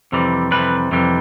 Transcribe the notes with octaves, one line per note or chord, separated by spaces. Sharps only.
F2 C3 E3 G3
F2 C3 E3 G3 B4
F2 C3 E3 G3